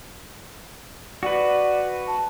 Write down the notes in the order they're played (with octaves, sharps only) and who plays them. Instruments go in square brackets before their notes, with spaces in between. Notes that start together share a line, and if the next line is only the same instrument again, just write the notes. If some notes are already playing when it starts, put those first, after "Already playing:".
[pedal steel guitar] F#4 B4 [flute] D5
[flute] A5